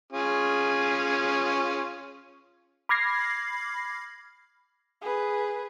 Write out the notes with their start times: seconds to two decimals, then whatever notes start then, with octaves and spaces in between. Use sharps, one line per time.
0.13 C#4 F4 G#4
2.89 B5 D6 F6 G#6 A#6 C7
5.02 G#4 B4